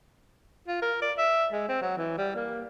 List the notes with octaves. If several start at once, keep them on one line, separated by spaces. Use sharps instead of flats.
F4
A#4
D5
E5
G#3
C4
F#3
E3
G3
A#3